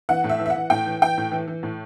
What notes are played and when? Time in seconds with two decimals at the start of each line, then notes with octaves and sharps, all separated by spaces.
0.09 E3 F#5
0.24 A2
0.29 E5
0.40 E3
0.46 E5
0.50 F#5
0.56 E3
0.70 A2 G5
0.86 E3
1.02 E3 G5
1.17 A2
1.32 E3
1.48 E3
1.63 A2